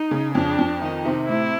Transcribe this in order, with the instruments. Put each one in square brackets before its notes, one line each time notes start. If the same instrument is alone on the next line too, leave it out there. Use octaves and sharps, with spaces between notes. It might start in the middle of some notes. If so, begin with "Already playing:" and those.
Already playing: [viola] D#4
[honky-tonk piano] C#3
[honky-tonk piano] F2 [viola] D4
[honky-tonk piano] F2
[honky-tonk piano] D#3 [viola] D#4
[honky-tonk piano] C3
[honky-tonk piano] A2 [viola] E4